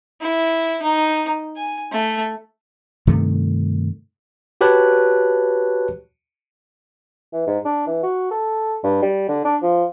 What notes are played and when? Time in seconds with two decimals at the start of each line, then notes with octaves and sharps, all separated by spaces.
0.21 E4
0.83 D#4
1.57 G#5
1.92 A3
3.07 G2 C3 D#3 A3
4.61 F#4 G4 B4 C#5 A5 F#6
7.33 E3
7.47 G#2
7.65 D4
7.87 E3
8.03 F#4
8.31 A4
8.84 G2
9.02 G3
9.28 D3
9.44 D4
9.62 F3